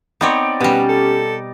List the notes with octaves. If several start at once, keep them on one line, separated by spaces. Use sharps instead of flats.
B3 C4 D#4 C#5 D5
B2 G3 B3 C#4 G4
A4